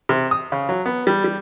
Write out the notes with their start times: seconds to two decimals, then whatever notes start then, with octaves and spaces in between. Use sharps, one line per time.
0.09 C3
0.31 D#6
0.52 C#3
0.69 F#3
0.86 B3
1.07 G3
1.24 G3